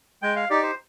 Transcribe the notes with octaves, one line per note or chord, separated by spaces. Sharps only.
G#3 G5
F5
D#4 G4 D5
C5